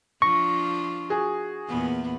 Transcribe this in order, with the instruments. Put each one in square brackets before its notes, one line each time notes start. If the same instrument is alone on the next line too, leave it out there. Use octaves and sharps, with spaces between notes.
[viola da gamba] F3 D4 F4 [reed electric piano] C#6 [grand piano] A#6
[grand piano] F#4 G#4
[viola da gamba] E2 A#2 B3